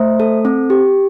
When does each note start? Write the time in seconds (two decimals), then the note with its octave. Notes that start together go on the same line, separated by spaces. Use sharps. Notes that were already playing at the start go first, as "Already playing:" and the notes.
Already playing: A3 C5 E5
0.20 A4
0.45 C4
0.70 G4